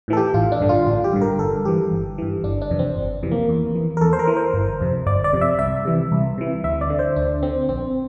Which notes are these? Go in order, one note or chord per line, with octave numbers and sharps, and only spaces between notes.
A2 E3 A4
G4
A1 F4
D4
G2 D3
F4
A1 F4
G4
G2 D3
A#4
G1 A4
G2 E3 G4
G1
G2 E3
G1 D4
D4
F2 C3 E3
C4
G1
F2 C3 E3
A#3
E2
E3
A#4
E2 A4
C5
A#4
E3
C5
G1
F2 C3
G1 D5
D5
F2 C3
E5
C2 E5
C3 E3
C2
C3 E3
D2 E5
D5
D3
C5
D2 D4
D3 C4
A#1 C4